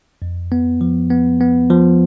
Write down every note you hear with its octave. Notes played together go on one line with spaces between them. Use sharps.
F2
B3
F3
B3
B3
F3